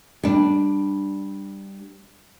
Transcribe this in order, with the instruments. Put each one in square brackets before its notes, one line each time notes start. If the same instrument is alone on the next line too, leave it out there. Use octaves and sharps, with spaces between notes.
[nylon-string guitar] G3 D4